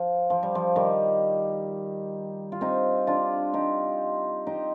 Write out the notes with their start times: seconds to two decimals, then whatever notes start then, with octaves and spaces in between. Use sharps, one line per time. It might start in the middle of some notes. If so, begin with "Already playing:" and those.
Already playing: F3
0.30 F3
0.43 G3
0.55 F3
0.76 D#3 G3
2.52 F4
2.61 C4 D#4
3.07 D4 F4
3.54 D#4 G4
4.47 D#4 G4